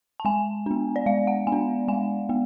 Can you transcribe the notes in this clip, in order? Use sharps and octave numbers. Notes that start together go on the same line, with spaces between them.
A5
G#3 G#5
B3 D4
D5
G#3 F5
F#5
B3 G#5
D4
G#3 G#5
B3